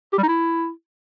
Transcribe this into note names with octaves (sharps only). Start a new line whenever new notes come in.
G4
G3
D#4
E4